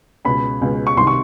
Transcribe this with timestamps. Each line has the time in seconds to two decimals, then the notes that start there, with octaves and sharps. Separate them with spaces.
0.25 C#2 B2 G#3 C#4 B5
0.61 C#2 B2 G#3 C#4
0.87 C#6
0.97 C2 C3 D#3 C6
1.07 C#6